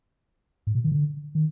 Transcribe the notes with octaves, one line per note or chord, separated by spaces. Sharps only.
G#2
B2
D#3
D3
D#3